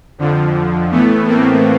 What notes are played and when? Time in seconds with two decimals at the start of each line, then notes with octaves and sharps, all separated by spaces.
0.18 F2 D3 F3
0.91 A2 E3 A3 B3
1.27 A#3 C4